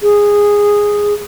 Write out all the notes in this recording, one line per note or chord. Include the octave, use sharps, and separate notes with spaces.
G#4